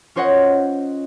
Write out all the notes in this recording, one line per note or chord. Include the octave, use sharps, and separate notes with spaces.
C#4 F4 C5 C#5 D#5 F#5